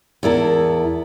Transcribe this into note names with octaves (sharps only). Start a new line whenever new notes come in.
E2 E4 A#4 A5